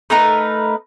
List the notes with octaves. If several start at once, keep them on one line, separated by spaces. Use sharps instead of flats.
A3 D#4 A#4 B4